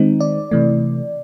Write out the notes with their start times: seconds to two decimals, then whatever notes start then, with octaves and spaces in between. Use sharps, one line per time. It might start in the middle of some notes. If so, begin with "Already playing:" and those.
Already playing: D#3 G#3 C4 D#4
0.21 D5
0.51 C3 E3 A3